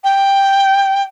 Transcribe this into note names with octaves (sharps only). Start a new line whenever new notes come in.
G5